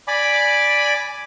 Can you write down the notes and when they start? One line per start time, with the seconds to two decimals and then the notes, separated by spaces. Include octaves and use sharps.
0.08 D5 G#5 B5 D6